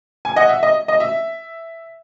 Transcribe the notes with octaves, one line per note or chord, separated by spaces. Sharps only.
G#5
D#5 F#5
E5
D#5
D#5
E5